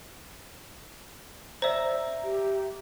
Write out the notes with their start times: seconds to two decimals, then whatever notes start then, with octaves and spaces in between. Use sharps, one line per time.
1.62 C5 D5 E5 A#5
2.24 G4